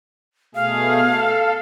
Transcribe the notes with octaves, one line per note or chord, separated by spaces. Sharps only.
B2 A3 G#4 F5
A4